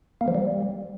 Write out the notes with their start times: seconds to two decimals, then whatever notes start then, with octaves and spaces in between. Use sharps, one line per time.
0.21 A#3
0.28 F3
0.35 G3